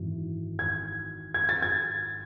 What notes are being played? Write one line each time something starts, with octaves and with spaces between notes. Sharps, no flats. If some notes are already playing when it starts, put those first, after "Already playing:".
Already playing: G#1 F#2 E3
G#6
G#6
A6
G#6